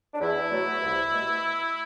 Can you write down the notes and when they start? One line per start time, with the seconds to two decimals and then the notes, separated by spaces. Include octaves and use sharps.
0.12 D4
0.20 E2 E4
0.51 B2 F#3 A3
0.81 C2
1.12 B2 A3